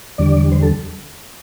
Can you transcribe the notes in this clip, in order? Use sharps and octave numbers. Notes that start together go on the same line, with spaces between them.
E2 D3 G3 D5
C5
A4